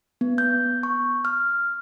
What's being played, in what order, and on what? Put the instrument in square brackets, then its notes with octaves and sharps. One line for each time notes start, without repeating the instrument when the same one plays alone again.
[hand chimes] B3
G6
C#6
F6